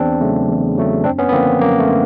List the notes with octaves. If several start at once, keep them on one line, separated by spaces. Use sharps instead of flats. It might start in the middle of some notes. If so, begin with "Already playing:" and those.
Already playing: E2 C4 D4
C#3 F#3 A3
E2
C#3 F#3 A3
F#2 C4 D4
B3 C#4
B3
D3 F3 A#3 C4
F#2 A#3
A3
D3